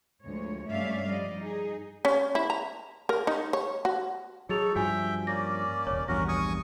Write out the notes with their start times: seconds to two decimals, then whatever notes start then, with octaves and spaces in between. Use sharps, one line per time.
0.23 D2 F3 G#3 C#5
0.70 G2 A3 C#4 D5 E5 F5
1.06 F3 G3 D5 D#5
1.40 D#4 G#4
2.05 C#4
2.35 E4
2.50 A#5
3.09 A#4
3.27 D#4
3.53 C#5
3.85 F#4
4.49 F#3 D#4 G#4 A4 C#5 A6 F7
4.75 G2 F3 F#4 E5 G5 G#5
5.27 A#3 C#4 D5 A#6
5.87 D#1 G#1 C#5
6.08 A#1 E2 G2 C#4 F#4 A#4 A#6
6.28 G#5 C#6 D#6